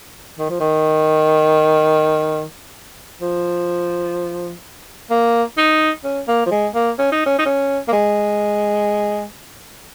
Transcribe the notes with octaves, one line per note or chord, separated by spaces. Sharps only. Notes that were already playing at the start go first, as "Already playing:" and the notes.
D#3
F3
D#3
F3
A#3
D#4
C#4
A#3
F3
G#3
A#3
C#4
D#4
C#4
D#4
C#4
A#3
G#3